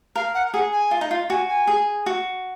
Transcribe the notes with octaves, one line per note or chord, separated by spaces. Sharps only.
A#4 F5
F#5
G#4 F#5
G#5
F4
D#4
F4
F#4 G#5
G#5
G#4
F#4